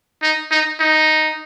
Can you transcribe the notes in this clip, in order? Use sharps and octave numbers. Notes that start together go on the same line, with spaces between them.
D#4
D#4
D#4